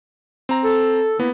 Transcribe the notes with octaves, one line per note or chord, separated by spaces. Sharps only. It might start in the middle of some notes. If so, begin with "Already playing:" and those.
C4 A#5
A4
D#3 A#3 B3 E4